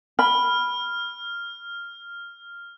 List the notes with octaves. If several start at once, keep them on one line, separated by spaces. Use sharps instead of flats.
B5 F6